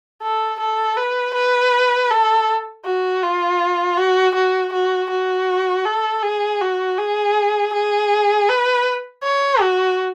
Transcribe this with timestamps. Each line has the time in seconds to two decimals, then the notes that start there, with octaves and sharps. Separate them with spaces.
0.22 A4
0.60 A4
0.97 B4
1.34 B4
2.11 A4
2.85 F#4
3.23 F4
3.97 F#4
4.35 F#4
4.73 F#4
5.10 F#4
5.85 A4
6.23 G#4
6.61 F#4
6.98 G#4
7.73 G#4
8.49 B4
9.24 C#5
9.61 F#4